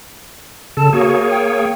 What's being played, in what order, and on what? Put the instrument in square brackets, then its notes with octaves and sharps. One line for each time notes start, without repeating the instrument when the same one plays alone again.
[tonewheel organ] C#3 A4 [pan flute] A5
[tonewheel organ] A#3 G#4 C#5 [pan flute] F#4
[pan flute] G5